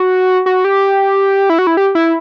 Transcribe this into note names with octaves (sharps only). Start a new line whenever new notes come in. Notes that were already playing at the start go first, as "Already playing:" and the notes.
Already playing: F#4
F#4
G4
E4
F#4
E4
G4
E4